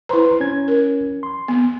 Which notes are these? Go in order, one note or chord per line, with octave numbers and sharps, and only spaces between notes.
E4 B4 C5 A#5 C6
C#4 G#6
A#4
C6
B3